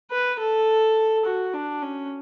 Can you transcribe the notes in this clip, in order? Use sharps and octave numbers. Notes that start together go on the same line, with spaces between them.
B4
A4
F#4
D4
C#4